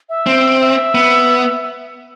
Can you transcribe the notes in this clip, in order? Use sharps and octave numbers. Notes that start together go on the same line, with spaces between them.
E5
C4
E5
B3